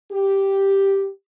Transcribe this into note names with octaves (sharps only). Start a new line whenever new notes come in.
G4